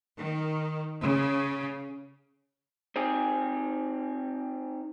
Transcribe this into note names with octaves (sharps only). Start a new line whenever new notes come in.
D#3
C#3
C4 D#4 G4 G#4